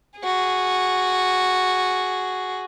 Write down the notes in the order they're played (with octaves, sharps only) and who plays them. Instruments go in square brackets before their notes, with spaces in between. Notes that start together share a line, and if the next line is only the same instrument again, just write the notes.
[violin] F#4 G#4